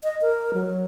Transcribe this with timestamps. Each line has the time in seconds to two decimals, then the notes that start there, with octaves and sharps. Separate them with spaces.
0.04 D#5
0.21 A#4
0.54 F#3